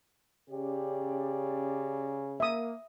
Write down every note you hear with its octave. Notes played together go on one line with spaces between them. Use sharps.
C#3 C#4 G4 D5
A#3 E5 D#6